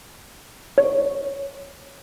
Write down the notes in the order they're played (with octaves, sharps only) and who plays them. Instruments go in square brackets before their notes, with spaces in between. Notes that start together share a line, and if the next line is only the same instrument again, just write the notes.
[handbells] C#5